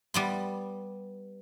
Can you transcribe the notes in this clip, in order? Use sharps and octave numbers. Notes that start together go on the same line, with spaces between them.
G3 B3 C6